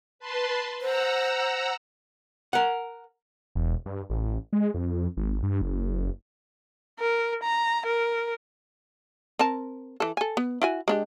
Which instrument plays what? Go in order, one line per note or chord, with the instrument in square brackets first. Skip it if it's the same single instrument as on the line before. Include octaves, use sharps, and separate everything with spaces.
[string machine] B4 A5 C6
[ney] C5 [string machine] F#5 A#5 E6
[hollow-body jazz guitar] A#4 F#5
[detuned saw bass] E1
G2
A1
G#3
F2
G#1
G2
F#1
[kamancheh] A#4
A#5
A#4
[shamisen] C4 A#4 A5
E3 A4
A4 G#5
B3
E4 F#4 G#5
G#3 D4 G4